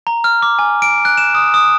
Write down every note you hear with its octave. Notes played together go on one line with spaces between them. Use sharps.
A#5
F6
D6
G#5
D7
F#6
E7
D#6
D#6